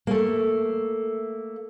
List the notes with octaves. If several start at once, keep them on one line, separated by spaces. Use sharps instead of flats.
A3 A#3